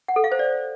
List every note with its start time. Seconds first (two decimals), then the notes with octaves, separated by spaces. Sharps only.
0.08 F#5
0.16 A4
0.24 F5
0.32 C5
0.39 D5